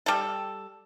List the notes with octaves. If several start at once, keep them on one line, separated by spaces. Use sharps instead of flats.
G3 A4